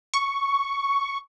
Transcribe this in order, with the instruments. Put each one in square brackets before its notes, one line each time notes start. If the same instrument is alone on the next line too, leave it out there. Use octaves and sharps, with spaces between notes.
[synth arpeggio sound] C#6